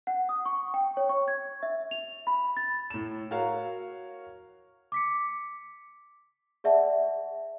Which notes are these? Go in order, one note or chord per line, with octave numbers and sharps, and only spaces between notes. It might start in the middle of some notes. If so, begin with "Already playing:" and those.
F#5
D#6
C#6
G5
C#5
C#6
G#6
E5
F7
B5
A6
A2 E7
F#4 A#4 C#5 F5
D6 B6 C#7
G#4 D5 E5 F#5 A5